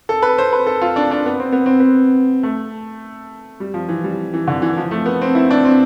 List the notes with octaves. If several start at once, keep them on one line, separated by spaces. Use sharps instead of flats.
A4
B4
C5
B4
A4
F4
D4
D4
B3
C4
B3
C4
B3
A3
G3
F3
E3
G3
E3
D3
E3
F3
A3
B3
C4
E4
D4
C4